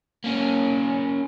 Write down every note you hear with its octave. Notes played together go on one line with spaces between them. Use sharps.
A#3 C#4